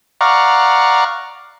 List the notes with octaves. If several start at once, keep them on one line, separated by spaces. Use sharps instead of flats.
D5 F5 F#5 A#5 C#6